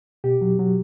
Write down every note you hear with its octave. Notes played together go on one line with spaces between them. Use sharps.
B2 G4
F#3
F#3